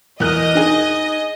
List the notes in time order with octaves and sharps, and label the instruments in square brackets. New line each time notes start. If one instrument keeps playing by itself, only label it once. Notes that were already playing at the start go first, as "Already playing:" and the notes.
[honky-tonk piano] E2 A#4 F#6 [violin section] D#5
[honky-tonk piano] D#4 G#4